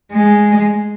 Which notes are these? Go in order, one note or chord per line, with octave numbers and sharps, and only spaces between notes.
G#3